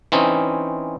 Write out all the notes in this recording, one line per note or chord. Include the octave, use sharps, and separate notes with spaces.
E3 C4 C#4 D#4